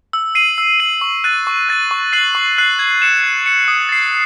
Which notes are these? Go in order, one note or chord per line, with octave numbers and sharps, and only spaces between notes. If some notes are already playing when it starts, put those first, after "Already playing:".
E6
C7 D#7 F#7
E6
C7 D#7 F#7
C#6
F#6 A6 D#7
C#6
F#6 A6 D#7
C#6
F#6 C7 F#7
C#6
F#6 C7 F#7
G#6
C#7 E7
G#6
C#7 E7
D#6
A6 C7